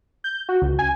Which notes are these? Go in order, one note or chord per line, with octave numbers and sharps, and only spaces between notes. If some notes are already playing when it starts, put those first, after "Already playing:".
G6
F#4
C#2
G#5